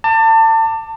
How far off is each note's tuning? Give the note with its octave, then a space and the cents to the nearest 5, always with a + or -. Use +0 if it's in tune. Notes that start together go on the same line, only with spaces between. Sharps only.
A5 +30 D6 +10